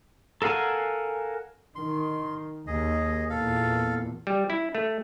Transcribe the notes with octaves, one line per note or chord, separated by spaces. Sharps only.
A4 A#4 F5 F#5 G#5
D#3 C6
D#2 G#4 D#5
E2 A#2 A4 F5
G3
E4
A3